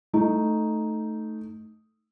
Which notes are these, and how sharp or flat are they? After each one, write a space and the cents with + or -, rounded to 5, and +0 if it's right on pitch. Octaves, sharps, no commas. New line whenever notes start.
A3 +0 D#4 +0